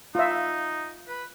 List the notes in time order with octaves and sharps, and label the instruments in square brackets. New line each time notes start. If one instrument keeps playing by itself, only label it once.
[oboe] D#4 [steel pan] F4 E5
[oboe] B4